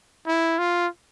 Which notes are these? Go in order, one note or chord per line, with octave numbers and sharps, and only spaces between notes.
E4
F4